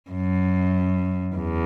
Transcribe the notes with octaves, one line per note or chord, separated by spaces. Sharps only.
F#2
E2